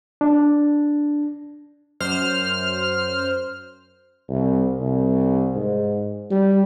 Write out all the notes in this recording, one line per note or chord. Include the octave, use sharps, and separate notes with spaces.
D4
F#2 C5 F6
C2
C2
G#2
G3